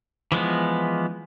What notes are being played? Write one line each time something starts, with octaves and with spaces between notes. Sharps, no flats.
E3 F3 G#3 B3